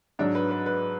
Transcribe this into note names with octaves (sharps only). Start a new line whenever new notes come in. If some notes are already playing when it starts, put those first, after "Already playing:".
G#2 F#3 D4
B4
B4
B4